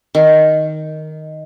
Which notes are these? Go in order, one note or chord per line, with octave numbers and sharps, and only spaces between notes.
D#3